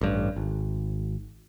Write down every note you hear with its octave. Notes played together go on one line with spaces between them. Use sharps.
A1 G2
G#1